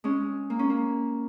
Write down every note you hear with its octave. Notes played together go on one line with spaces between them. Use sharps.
G#3 C#4
A#3
C#4
A#3